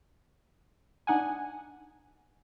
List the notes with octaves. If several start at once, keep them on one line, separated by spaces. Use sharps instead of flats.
D4 D#4 F#5 G#5